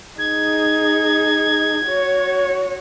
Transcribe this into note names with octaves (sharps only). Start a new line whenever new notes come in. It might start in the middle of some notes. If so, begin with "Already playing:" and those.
D#4 G#4 G#6
F#4 C#5